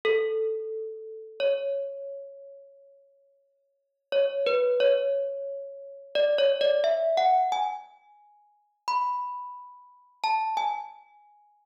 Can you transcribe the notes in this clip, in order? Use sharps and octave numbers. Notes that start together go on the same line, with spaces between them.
A4
C#5
C#5
B4
C#5
D5
C#5
D5
E5
F#5
G#5
B5
A5
G#5